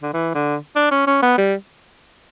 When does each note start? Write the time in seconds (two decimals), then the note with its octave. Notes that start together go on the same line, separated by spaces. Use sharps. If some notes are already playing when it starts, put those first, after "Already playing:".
0.02 D3
0.13 E3
0.35 D3
0.76 D4
0.91 C#4
1.07 C#4
1.22 B3
1.38 G3